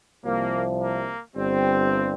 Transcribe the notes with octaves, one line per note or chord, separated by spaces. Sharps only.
C2 C3 F3 A#3
A#3
G1 G2 G3 C4